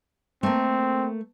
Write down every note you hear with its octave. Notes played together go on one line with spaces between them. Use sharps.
A3 A#3 C4